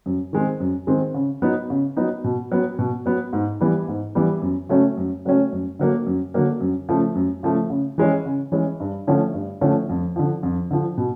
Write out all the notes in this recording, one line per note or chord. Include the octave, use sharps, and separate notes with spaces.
F#2
D#3 G#3 C4
F#2
D#3 G#3 C4
C#3
F#3 B3 D#4
C#3
F#3 B3 D#4
B2
F#3 B3
B2
F#3 B3
G#2
E3 G3 B3
G#2
E3 G3 B3
F#2
C#3 F#3 A3 C#4
F#2
C#3 F#3 A3 C#4
F#2
D3 F#3 A#3
F#2
D3 F#3 A#3
F#2
C#3 F3 A3
F#2
C#3 F3 A3
C#3
E3 G#3 C#4
C#3
E3 G#3 C#4
G2
D3 F3 A3 C#4
G2
D3 F3 A3 C#4
F2
D3 F3
F2
D3 F3
B2